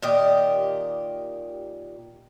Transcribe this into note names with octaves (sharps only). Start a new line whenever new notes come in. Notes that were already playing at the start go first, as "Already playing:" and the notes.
A#2 D#3 G4 D#5